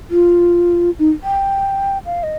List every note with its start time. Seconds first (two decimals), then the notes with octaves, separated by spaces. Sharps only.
0.10 F4
0.99 D#4
1.23 G5
2.06 F5
2.23 D#5